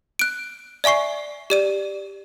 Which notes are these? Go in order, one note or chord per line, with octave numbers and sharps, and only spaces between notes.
F#6 D7
D5 E5 G#5 C#6 C7
G4 D5 D#7